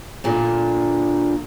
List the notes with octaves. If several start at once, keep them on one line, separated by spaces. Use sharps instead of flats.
A#2 D3